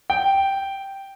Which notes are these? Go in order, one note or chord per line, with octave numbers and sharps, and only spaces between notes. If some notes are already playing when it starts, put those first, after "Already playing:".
G5